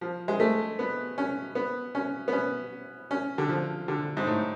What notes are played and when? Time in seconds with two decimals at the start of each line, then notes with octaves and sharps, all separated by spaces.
0.01 F3
0.28 G#3
0.40 A3
0.79 B3
1.18 C#4
1.55 B3
1.95 C#4
2.28 B3
2.33 C#4
3.11 C#4
3.38 D3
3.49 F3
3.88 D3
4.17 G#2
4.27 A2